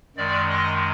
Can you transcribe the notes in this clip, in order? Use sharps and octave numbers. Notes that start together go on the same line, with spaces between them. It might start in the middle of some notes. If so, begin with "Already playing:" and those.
F#2 D#3 G#3 D5
D#5